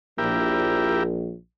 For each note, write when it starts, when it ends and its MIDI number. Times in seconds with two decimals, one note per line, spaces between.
0.18 1.33 34
0.18 1.03 64
0.18 1.03 67
0.18 1.03 70